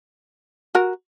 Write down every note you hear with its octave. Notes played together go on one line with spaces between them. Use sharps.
F#4 A#4